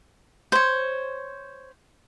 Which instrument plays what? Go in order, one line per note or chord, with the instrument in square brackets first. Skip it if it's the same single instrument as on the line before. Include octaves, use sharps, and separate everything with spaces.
[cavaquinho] C5 C#5